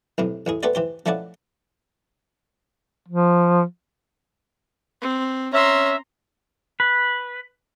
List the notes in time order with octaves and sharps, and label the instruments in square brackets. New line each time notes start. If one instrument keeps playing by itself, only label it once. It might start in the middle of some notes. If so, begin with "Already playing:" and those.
[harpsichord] B1 A2 C3
A1 A2 G#4
A3 B3 G4 B4 C5 D5
E3 G4 C5
F3 A3 C#4 E4 D5 F#5
[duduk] F3
[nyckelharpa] C4
[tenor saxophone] C#4 [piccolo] E5 [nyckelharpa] A#5 C6
[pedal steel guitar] B4